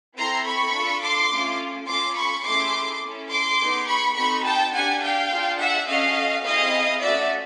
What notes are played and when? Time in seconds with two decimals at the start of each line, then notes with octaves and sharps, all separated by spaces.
0.16 C4 E4 A4 A#5 C6
0.45 B5 C#6
0.73 D4 F4 A4
1.01 C6 D6
1.30 A3 C#4 F4 A4
1.87 C#4 F4 A4 C6 D6
2.16 B5 C#6
2.44 A3 C#4 E4 G#4 C6 D6
3.02 C#4 E4 A4
3.30 C6 D6
3.59 B3 D#4 G#4
3.88 B5 C#6
4.15 C4 D#4 F#4 A4 B5 C#6
4.45 G5 A5
4.73 D4 G4 F#5 G#5
5.01 F5 G5
5.30 D4 F4 G#4
5.59 E5 F#5
5.87 C#4 F#4 A4 D#5 F5
6.44 C4 E4 G#4 D#5 F5
7.02 A3 C#4 F#4 D5 E5